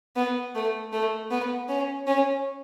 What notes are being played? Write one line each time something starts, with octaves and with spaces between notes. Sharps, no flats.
B3
A3
A3
B3
C#4
C#4